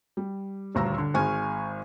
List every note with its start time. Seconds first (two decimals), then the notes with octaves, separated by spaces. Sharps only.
0.17 G3
0.75 D#1 D2 G2 A#5 C#6 E6
0.98 D3
1.14 G#1 G#3 G#5 C#6 F6